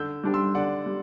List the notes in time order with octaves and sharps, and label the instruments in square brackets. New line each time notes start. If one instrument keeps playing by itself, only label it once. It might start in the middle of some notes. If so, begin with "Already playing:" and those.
Already playing: [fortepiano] D3 [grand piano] E6 G6
[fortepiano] G3 D4 G4
[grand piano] C6 E6
[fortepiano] D3 [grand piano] D5 F#5
[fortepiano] G3